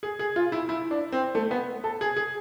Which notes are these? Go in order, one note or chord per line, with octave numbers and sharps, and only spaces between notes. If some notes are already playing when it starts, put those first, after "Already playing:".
G#4
G#4
F4
E4
E4
D4
C4
A3
B3
A4
G#4
G#4